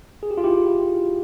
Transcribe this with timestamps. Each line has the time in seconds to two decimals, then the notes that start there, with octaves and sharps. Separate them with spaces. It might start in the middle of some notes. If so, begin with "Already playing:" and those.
0.23 G#4
0.31 G4
0.37 F4
0.44 E4 G4